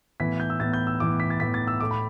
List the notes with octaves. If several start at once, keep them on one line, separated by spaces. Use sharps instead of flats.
A2 E3 B3 B6
G6
E6
A2 E3 B3 A6
G6
E6
A2 E3 B3 D6
B6
A6
A2 E3 B3 B6
A6
E6
A2 A3 D6
B5